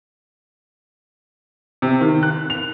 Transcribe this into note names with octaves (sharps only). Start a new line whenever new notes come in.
C3
D#3
F#6
F7